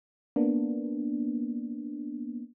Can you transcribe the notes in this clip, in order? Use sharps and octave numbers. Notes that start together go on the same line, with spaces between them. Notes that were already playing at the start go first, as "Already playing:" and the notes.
A#3 B3 D4